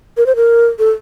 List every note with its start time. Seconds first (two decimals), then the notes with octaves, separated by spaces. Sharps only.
0.17 A#4
0.26 C5
0.36 A#4
0.79 A4